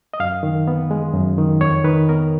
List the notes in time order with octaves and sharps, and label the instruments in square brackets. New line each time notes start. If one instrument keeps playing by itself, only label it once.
[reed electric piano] D#5
F#2 F5
D#3
B3
G#3
F#2
D#3
F2 C#5
D#3 B4
B3 A#4